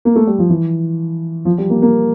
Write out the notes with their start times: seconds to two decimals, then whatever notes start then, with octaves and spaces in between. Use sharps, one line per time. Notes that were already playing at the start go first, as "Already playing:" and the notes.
0.05 A#3
0.16 A3
0.27 G3
0.39 F3
0.49 E3
1.45 F3
1.58 G3
1.70 A#3
1.82 A#3